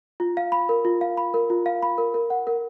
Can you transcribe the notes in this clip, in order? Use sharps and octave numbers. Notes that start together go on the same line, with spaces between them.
F4
F5
B5
A#4
F4
F5
B5
A#4
F4
F5
B5
A#4
A#4
F#5
A#4